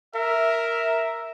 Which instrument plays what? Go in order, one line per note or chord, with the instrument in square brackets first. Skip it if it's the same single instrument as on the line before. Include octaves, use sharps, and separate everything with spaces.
[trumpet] A#4 [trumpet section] E5